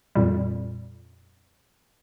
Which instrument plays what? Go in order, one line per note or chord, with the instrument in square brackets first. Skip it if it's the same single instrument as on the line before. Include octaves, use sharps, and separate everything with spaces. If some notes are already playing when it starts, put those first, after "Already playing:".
[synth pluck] F2 A#2 G3